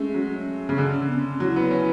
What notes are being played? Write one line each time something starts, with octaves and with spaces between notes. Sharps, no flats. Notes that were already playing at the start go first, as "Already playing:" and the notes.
Already playing: G#3 A3 C#4
F#3
C#3
D3
C#4
B3
C#4
F#3 E4
B3
C#4